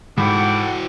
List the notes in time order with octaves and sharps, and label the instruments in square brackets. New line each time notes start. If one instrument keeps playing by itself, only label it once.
[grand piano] G#2 B5 [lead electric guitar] E3 F#4 [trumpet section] A4 F#5 G5 [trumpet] D6